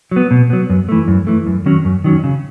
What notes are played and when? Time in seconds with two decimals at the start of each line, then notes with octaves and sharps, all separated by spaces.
0.11 F#3 B3
0.31 B2
0.50 F#3 B3
0.70 F#2
0.89 E3 A3
1.08 F#2
1.27 E3 A3
1.47 F#2
1.66 D#3 F#3 C#4
1.85 F#2
2.04 D#3 F#3 C#4
2.24 C#3